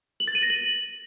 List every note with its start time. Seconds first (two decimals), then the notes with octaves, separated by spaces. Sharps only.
0.20 F#7
0.28 A6
0.35 D#7
0.42 A#6
0.50 F#7